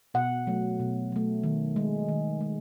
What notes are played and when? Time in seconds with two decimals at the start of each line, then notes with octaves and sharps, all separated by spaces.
0.14 B2 F#5
0.47 F#3 A3
0.80 B2
1.12 F#3 A3
1.44 D#3
1.76 G#3
2.09 D#3
2.41 G#3